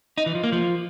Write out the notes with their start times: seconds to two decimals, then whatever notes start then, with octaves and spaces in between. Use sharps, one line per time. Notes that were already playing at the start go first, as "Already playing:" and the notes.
0.18 D#4
0.26 E3
0.35 F3
0.44 A#3
0.52 F3